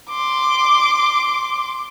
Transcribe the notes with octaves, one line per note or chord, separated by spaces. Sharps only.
C6 D6